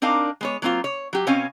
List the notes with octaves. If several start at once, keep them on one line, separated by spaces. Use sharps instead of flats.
C4 D4 D#4 A#4 F5
G#3 B3 C#5
F#3 A#3 C4 E4 F4
C#5
F#3 G4
B2 C4 C#4 C#5 F5 G#5